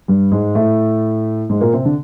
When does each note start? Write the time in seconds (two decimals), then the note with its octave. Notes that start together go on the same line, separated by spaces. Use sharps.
0.08 G2 G3
0.32 G#2 G#3
0.55 A2 A3
1.49 G#2 G#3
1.61 A#2 A#3
1.73 C3 C4
1.85 D3 D4